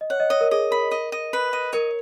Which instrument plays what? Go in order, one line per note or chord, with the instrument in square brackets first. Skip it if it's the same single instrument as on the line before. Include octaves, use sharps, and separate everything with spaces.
[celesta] D#5
[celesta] C#5 [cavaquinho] F#5
[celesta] D#5
[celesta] C#5 [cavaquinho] D#5
[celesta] A#4
[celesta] G#4 [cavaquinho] D#5
[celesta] A#4 [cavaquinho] B5
[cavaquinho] D#5
D#5
B4
D#5
[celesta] A#4 [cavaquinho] C#5